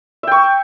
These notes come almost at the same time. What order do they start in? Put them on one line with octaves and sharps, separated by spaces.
E5 G5 C#6